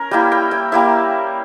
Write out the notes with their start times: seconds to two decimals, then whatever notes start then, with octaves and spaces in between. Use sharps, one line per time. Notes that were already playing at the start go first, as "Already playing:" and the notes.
Already playing: C#4 A#4
0.11 G3 A#3 E4 G5
0.32 G5
0.51 G5
0.72 G3 A#3 E4 E5